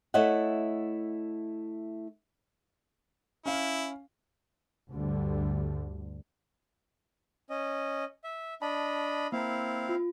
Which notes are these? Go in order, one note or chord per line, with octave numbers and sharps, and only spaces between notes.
A3 E4 C#5 D#5 F#5
C#4 E4 F5
D2 G2 D3 G3
C#4 D#5
E5
D4 D#5 A5 B5
A#3 C4 E4 F5 A#5
F4